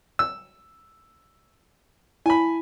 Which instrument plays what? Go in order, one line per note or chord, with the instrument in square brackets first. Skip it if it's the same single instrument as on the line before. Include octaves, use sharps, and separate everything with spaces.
[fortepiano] E6
[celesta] E4 [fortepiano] G#5 B5